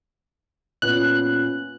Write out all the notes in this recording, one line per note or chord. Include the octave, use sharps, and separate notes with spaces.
A#2 B3 C#4 F#6